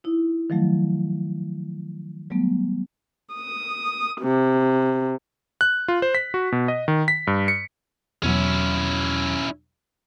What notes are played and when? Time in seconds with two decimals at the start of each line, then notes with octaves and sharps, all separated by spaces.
0.04 D#4 E4
0.50 D#3 F3 F#3 A3
2.30 F#3 G3 A3 B3
3.34 D#6
4.22 C3
5.61 F#6
5.88 F4
6.02 C5
6.15 B6
6.34 F#4
6.52 B2
6.68 D#5
6.88 D#3
7.08 B6
7.27 G2
7.48 C#7
8.23 E2 B2 F#3 C#4 E4